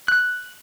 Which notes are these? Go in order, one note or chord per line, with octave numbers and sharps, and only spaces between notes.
F#6